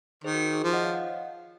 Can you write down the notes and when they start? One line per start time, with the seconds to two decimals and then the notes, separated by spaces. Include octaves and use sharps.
0.24 D#3 G#4 C5
0.34 F#4 A#4
0.44 F#4
0.54 G#4
0.64 F3
0.73 D#5 F#5
0.83 C#5 F5
0.93 D#5 F#5